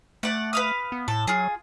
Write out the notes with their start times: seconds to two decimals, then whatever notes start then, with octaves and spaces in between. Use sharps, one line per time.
0.23 A3 D5 F#5
0.53 B4 F5 D#6
0.92 B3
1.08 A2 A4
1.27 F#3 F4 G#4